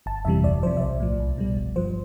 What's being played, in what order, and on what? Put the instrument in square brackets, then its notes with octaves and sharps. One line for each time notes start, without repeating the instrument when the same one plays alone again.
[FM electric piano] G1 A5
F2 C3 E3 G3 E5
D2 D5
C3 F3 C5
E5
B1 D5
A2 F3
C2
B2 G3
G1
G2 F3 C5